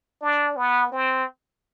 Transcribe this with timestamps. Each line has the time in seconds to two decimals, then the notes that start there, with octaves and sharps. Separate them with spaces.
0.22 D4
0.56 B3
0.92 C4